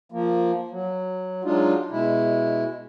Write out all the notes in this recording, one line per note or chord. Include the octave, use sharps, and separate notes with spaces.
F3 A#3
F#3
F#3 G#3 D4 D#4 F4
B2 G#3 E4